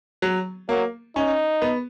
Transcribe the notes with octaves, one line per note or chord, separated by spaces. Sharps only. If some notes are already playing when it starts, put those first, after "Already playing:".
F#3
F#3 A#3
C#4 D#4
B3